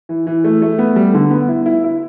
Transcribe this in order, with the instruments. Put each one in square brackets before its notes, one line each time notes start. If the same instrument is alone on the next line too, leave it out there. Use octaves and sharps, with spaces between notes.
[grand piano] E3
E3
A3
A3
B3
G3
D3
B3
E4
E4
E4